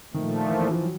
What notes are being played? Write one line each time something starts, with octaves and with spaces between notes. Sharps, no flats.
A#2 D#3 F3 A3
E3
E3
F3
F#3